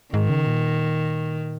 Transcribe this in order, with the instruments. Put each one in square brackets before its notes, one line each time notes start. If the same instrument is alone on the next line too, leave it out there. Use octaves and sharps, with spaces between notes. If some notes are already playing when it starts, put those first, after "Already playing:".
[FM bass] G#2 [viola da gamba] D#3
[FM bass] C#3
A#2